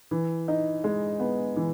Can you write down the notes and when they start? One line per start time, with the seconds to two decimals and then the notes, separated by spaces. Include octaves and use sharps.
0.11 E3
0.48 D#4
0.84 G#3
1.20 B3
1.56 E3